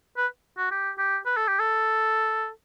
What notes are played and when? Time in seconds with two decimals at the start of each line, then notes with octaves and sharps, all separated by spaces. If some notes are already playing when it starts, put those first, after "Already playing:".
0.17 B4
0.58 F#4
0.71 G4
0.99 G4
1.26 B4
1.37 A4
1.48 G4
1.60 A4